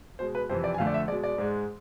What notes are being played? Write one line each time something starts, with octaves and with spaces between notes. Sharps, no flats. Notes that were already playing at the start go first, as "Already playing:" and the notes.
B2 G#3 C5
B4
F2 C3 E3 C5
D5
G#5
F2 D3 A3 F5
D5
E5
B2 G#3 D5
D5
G#2 G#3